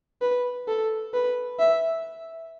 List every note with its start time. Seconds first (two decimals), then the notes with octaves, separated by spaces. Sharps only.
0.21 B4
0.68 A4
1.14 B4
1.59 E5